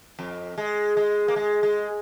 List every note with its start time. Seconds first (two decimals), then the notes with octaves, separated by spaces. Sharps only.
0.19 F2
0.58 G#3
0.97 G#3
1.28 A#3
1.36 G#3
1.63 G#3